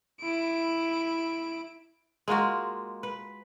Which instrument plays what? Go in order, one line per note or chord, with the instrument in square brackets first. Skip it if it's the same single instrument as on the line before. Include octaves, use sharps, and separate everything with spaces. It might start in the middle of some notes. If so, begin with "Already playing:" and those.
[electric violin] E4 D7
[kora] G#3 A#3 F4 F#4
B4